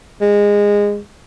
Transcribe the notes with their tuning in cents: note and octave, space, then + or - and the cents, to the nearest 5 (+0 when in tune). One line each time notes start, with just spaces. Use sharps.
G#3 -20